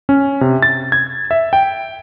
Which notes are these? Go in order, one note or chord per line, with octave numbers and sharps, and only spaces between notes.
C#4
C3
A6
G#6
E5
G5